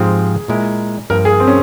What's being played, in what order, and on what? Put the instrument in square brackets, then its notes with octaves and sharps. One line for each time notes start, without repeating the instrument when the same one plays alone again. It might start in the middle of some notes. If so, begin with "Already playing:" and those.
Already playing: [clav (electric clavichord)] G#2 F3 C4 G4 [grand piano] G#4
[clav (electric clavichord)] A#2 G#3 E4 A#4
[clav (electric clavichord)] G2 F3 A#3 [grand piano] A#4
[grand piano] G#4
C4
C#4